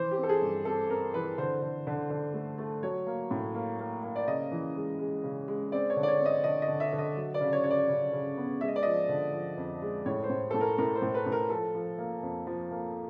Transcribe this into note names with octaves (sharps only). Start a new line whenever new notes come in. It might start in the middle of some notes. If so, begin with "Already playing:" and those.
Already playing: E3 C5
G4
C4
A4
G#4
G2
C4 A4
C4 A#4
E3 B4
D3 C5
D3
D3
D3
A3
A3
F#3 C#5
A#3
A2
A#3
A#3
A#3
D5
C#3 D#5
E3
G#3
G#3
C#3
G#3
C4 D5
C#5
D3
D5
C#5
C4
D#5
D3 D#5
D#5
D3
E5
D3
D#5
F#3
D5
C#3
C#5
C#3 C#5
D5
C#3
C#3
B3
G#3 E5
D#5
D5
F3 D#5
D3
F3
F2
G#3
A2 C#5
C5
A2
A2 A4
A#4
A2 A#4
C5
A2
B4
A2
A#4
F3 A4
F3
A#3
F2
F3
A#3